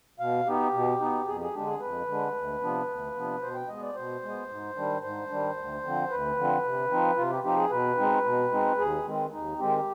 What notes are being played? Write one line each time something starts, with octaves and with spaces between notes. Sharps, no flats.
B2 F5
B3 D#4 G4
B2
B3 D#4
F2 G#4
G#4
D3 G#3 D4 G4
G#4
F2 B4
D3 G#3 D4
D2
C3 F3 B3 D4
D2
C3 F3 B3 D4
B2 C5
G5
G#3 B3 D#5
D5
B2 C5
G#3 B3
G#2
D#3 G3 D4
G#2 C5
D#3 G3 D4
D2
D3 F3 C4
D2 B4
D3 F3 C4
C3
F3 C4 D#4
C3 F4
G4
F3 C4 D#4 G4
G#4
B2 B4
G#3 C4 D#4
B2
G#3 C4 D#4
D#2 G#4
D#3 G#3 C4
D#2 D#4
D#3 G#3 C4 G4